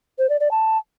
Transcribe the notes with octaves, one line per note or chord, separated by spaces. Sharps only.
C5
D5
D5
A5